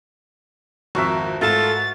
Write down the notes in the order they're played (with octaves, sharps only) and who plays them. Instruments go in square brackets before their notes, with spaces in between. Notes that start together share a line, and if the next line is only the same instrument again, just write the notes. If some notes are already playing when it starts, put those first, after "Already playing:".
[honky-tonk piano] G#1 F2 C4 [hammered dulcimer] F#4 A#4 E5
[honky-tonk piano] G#2 E7 [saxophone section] A3 F4 A4 [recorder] A6